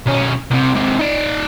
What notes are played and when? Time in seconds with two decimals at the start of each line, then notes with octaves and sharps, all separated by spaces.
0.07 B1 C#4
0.51 C2 C3
0.74 G#2 C3
0.99 D#4 D5